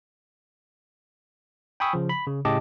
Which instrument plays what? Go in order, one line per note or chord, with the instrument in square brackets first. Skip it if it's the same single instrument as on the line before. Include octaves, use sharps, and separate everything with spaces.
[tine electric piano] G5 G#5 B5 C#6 D#6 E6
C#3 F3
B5
C#3
A2 C#3 G4 D#5 A5 D6